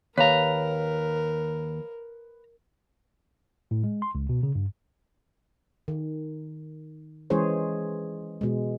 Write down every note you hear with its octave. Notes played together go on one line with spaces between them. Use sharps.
D#2 A#4 B4 C#5 F5 A#5
A2
G#3
C6
C#2
B2
C#3
G2
D#3
E3 G#3 C#4 G#4 C5 C#5
B2 G#3